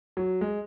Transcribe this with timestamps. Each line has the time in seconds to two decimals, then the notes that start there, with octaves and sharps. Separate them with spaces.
0.17 F#3
0.41 G#3